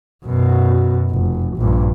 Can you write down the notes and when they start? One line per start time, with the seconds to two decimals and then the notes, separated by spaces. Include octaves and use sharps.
0.25 F#2 B2
1.10 F1
1.57 A#1 G2